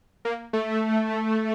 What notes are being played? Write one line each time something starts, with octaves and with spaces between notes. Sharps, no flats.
A#3
A3